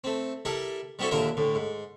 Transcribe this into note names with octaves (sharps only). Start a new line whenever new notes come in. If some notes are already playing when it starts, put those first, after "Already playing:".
A3 C4
G3 E4 A4 A#4
G3 B3 C4 E4 F#4 A4
A#1 D#2 D3 A#4 E5
D2 A2
G#2